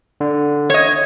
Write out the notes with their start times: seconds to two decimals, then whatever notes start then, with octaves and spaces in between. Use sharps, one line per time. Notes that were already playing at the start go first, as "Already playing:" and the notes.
0.20 D3
0.70 C#5 D#5 G#6